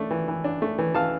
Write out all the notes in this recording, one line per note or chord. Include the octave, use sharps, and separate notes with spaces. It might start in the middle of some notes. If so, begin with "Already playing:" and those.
Already playing: A3 D4
E3
E3
D4
A3
E3
E3 F5 A5